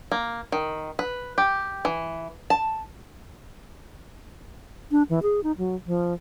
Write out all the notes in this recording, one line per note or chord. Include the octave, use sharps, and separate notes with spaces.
A#3
D#3
B4
G4
E3
A5
D4
E3
G#4
D#4
F#3
F3